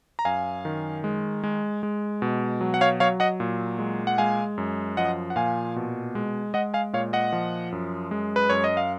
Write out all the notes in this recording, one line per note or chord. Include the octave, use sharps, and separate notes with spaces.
A#5
F#2 F5 G#5
D#3
G#3
G#3
G#3
B2
F#3
F#5
C#5 F5
F#3 C#5 F5
D#5 F#5
A#2
G#3
F#5
G#3 F5 G#5
F#2
F3 D#5 F#5
F#5
A#2 F5 G#5
B2
G#3
G#3 D#5 F#5
F5 G#5
A#2 C#5 F5
D#5 F#5
F3
F#2
G#3
B4
F#2 C#5
D#5
F5